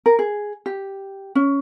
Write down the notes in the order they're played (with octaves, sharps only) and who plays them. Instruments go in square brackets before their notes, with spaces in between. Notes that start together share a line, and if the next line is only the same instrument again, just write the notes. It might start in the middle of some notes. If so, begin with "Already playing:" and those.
[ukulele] A#4
G#4
G4
C#4